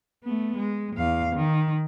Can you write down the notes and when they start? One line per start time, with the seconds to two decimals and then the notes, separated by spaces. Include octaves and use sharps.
0.24 A3 B3
0.58 G#3
0.97 E2 F5
1.36 D#3